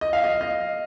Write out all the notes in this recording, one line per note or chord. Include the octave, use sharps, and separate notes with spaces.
D#5
F5
D#5
D#5